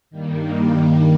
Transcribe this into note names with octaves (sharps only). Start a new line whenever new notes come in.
G2 D#3 G3 A#3